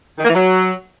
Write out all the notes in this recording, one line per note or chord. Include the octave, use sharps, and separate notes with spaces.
D#3
A#3
E3
F#3